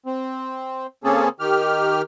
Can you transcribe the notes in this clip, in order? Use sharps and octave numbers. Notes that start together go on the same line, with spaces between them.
C4
C#3 A#3 C4 C#4 G#4 A4
D#3 G4 F6